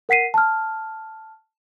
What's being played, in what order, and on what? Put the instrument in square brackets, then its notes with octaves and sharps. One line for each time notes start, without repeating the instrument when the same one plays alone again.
[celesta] A#4 F#5 B6 C7 D#7
A5 F6